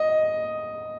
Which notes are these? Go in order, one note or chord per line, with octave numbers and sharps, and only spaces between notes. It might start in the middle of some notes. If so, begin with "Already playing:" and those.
Already playing: D#5